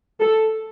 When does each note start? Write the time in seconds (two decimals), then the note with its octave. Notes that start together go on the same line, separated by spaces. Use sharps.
0.20 A4